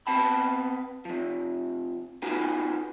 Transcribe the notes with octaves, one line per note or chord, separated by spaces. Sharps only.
B3 C4 A5 B5
C3 F3
B3 C#4 D#4 F4 F#4 G#5